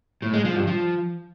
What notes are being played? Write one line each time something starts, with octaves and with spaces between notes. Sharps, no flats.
A2
G#3
F3
G2
F3